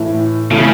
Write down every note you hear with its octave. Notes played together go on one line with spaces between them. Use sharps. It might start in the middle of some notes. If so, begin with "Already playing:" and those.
Already playing: A2 E3 A3
A2 C#3 E3 A3